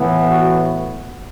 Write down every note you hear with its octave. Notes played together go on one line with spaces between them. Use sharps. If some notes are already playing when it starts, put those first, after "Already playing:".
Already playing: A2 E3 B3
F#4